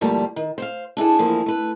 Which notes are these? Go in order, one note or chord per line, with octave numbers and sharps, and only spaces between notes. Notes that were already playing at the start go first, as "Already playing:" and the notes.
D2 G2 F3 G3 A3 A#3
D#3
C5 C#5 F5
D4 E4 G#4 A4
E2 F3 A#3 E4 G#4
A3 B4